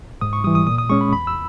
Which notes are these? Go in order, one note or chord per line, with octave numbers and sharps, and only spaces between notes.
G#2 D#6
C#6
E3 G3 D#6
D#6
A#2 D#6
D#6
G#3 C#4 C#6
B5
E2 B5
E6